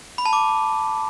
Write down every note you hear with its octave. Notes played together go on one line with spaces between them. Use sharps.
B5
A5
D6